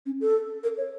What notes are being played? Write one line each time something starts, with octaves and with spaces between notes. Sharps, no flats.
C#4
A4
A#4
C#5